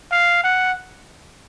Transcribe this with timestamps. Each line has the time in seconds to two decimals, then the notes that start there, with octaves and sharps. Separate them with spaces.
0.11 F5
0.44 F#5